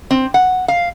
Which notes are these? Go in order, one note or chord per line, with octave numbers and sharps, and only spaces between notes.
C4
F#5
F5